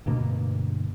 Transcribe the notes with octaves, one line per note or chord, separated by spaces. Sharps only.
D2 G2 B2 A#3